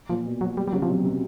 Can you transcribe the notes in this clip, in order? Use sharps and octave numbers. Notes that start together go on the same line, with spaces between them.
A#2 F3
B2
F#3
G3
G3
C#3 F#3
C3 F3
B2 F#3
C3